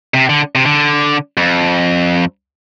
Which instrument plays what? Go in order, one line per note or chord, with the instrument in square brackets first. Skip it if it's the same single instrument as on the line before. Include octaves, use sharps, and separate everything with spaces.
[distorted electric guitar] C3
D3
C3
D3
F2